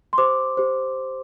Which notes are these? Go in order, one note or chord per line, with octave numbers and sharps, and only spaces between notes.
C6
G4 C5 D6
G4 C5